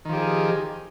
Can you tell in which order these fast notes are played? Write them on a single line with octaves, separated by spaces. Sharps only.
D#3 F3 G4 G#4